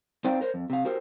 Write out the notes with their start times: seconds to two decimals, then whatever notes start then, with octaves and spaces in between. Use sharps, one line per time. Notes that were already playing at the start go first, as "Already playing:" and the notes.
0.24 C4 D#4 C5 D5 F5 G5
0.41 A#4 C5 C#5
0.54 F2
0.70 C3 F5
0.85 F#4 G4 A#4 C5